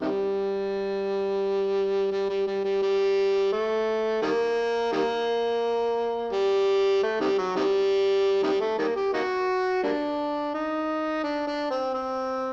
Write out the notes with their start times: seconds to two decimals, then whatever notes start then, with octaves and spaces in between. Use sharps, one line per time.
0.01 C3 D#3 G3
2.12 G3
2.29 G3
2.47 G3
2.64 G3
2.82 G3
3.52 A3
4.22 D#3 G3 A#3
4.92 D#3 G3 A#3
6.33 G3
7.03 A3
7.20 C3 D#3 G3
7.38 F#3
7.56 C3 D#3 G3
8.43 C3 D#3 G3
8.60 A3
8.78 D#3 G3 A#3
8.95 G4
9.13 A#3 D#4 F#4
9.83 G3 A#3 D4
10.54 D#4
11.23 D4
11.47 D4
11.70 C4
11.94 C4